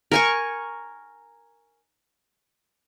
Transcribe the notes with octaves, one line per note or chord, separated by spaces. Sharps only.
A#4 G#5 C#6